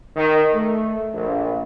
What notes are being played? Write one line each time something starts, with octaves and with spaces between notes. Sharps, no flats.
D#3
A3
A#1